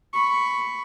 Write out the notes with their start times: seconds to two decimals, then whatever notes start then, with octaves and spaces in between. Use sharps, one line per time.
0.13 B5 C#6